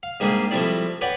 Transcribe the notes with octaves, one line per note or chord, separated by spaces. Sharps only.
F5
G#2 G3 A#3 D4 G4 G#4
F3 G3 A3 C4 E4 D5
B4 C#5 D5 F#5 G5